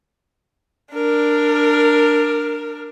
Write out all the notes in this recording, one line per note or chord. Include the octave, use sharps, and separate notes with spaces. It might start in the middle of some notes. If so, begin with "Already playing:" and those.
D4 A#4